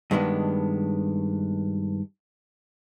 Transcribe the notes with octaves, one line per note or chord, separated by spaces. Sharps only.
G2 D#3 G#3 A#3 B3 D4